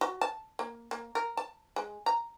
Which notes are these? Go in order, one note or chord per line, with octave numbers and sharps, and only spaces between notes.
F#4
A5
A#3
A#3
A#4
A5
G#3
A#5